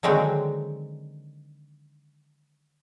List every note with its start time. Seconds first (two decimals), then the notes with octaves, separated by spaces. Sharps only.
0.03 D3 D#3 F#3 G#3 C4